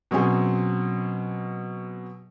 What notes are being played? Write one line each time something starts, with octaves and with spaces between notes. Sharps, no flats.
B2 F#3 C4 C#4 G#4